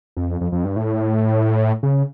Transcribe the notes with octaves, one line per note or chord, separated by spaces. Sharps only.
F2
F2
F2
G2
A2
C#3